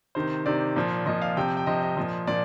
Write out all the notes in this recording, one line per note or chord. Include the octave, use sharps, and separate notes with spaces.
C3 D#3 C5
C3 D#3 D5
A#2 F3
A#2 F3 D#5
F5
C3 F3 G5
G5
C3 F3 D#5
D#5
A#2 F3
A#2 F3 D5